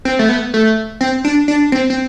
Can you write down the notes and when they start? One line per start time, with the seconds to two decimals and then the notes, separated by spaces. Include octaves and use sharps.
0.05 C4
0.19 A3
0.29 B3
0.54 A3
1.01 C4
1.25 D4
1.48 D4
1.72 C4
1.90 C4